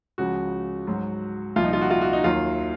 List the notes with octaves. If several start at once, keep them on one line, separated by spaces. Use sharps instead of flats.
C#2 C#3 F3 F#4
G#2 F#3
C2 A#2 F3 F4
D#4
F4
F#4
F4
F#4
D#4
D#2 D#3 F#3 F4